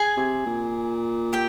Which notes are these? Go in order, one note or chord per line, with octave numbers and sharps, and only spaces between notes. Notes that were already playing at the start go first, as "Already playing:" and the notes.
Already playing: G#4 G#5
C3
A#2
G4 G5